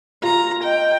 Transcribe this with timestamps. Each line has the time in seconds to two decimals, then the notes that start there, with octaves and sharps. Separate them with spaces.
0.23 F4 A#5
0.64 D#5 G5